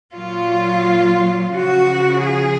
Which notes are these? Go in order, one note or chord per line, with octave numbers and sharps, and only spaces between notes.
A#2 F#3 F4
C#3 F3 F#4
G#4